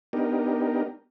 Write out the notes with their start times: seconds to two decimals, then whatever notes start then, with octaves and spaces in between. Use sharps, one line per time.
0.13 B3 D4 D#4 G4 A#4